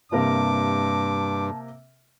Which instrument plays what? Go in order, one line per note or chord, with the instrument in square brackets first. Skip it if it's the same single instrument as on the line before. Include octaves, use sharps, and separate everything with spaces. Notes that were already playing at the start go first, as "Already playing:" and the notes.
[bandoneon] G2 [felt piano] C3 A#3 A#4 [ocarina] A5 [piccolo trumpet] D6